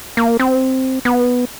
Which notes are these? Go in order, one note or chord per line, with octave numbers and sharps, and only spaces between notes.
A#3
C4
B3